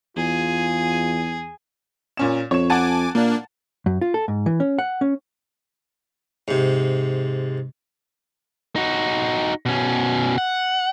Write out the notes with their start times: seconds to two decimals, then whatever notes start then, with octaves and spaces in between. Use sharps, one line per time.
0.17 E2 F4 G#4
2.17 A#2 C#4 E7
2.51 F2 C#5 E7
2.70 F#5 G#5 A5 D6 A6
3.15 A#2 A#3 D4
3.86 F#2
4.01 F4
4.14 A4
4.28 G#2
4.46 E3
4.60 C#4
4.79 F#5
5.01 C#4
6.48 G#2 C3
8.76 D#4 F#4
9.66 B2 C#4
10.38 F#5